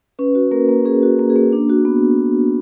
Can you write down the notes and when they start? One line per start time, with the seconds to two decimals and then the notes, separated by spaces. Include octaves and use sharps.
0.19 C#4 B4
0.35 F#4
0.51 A#3 A#4
0.69 A#3
0.85 C#4 G#4
1.03 F#4
1.19 A#3
1.30 G#4
1.36 A#3
1.53 D4
1.69 F#4
1.85 B3